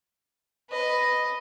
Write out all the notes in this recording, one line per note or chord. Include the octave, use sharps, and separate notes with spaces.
B4 D#5